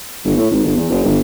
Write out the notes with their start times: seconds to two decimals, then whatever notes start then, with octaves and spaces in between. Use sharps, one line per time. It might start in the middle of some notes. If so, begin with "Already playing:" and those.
0.25 G1
0.37 A2
0.51 G#1
0.64 G1
0.76 E2
0.90 F#1
1.04 G1